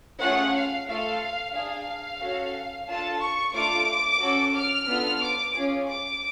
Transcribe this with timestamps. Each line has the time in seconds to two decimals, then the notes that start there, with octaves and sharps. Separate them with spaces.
0.20 A3 C#4 F4 G#4 F#5
0.54 F5
0.88 A3 F4 A4 F5
1.54 D4 G#4 F5
2.21 C#4 F#4 A4
2.88 D4 F4 A4 A5
3.20 C#6
3.53 A3 D4 F4 A4 D6
4.21 C#4 F#4 A4
4.54 F6
4.88 B3 D4 F4 A4
5.21 D6
5.53 C#4 F4 G#4
5.87 D6